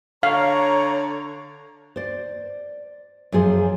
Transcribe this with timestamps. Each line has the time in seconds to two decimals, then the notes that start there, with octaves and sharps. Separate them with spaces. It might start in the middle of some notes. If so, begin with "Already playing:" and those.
0.23 D3 C#5 F5 A#5 C#6
1.96 C5 D5
3.32 F#2 F3 G#4 C5